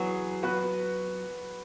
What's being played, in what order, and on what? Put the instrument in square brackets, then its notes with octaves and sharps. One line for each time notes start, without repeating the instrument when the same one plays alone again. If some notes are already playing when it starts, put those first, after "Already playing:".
Already playing: [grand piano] E3 B3 G#4 [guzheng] F#3
[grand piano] B3 F#4 B4